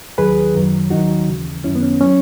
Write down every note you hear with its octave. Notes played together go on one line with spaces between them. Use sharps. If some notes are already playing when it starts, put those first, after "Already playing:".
D#2 D#3 F#3 G#4 B4
F#2 D#3 F#3
D#2 D#3 F#3 D#4 F#4
D#2 C#3 E3
F#2 D#3 F#3 C#4 E4
B3
C#4
F#3 C#4